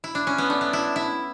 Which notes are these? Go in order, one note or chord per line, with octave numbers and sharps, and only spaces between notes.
E4
D4
C#4
B3
A3 D4
B3
E4
E4